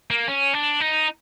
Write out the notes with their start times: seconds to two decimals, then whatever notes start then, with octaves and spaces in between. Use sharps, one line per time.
0.10 A#3
0.28 C#4
0.54 D4
0.80 D#4